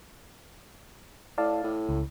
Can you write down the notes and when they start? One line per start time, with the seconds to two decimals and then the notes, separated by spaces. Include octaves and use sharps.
1.38 A2 D5 F5 A5
1.64 A2
1.89 C#2